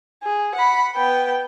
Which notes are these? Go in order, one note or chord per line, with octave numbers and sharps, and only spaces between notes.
G#4
F#5 B5
B3 G5